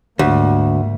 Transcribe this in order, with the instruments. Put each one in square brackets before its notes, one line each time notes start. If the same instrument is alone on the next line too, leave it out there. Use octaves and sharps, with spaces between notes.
[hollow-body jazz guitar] D2 [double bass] G#2 A#3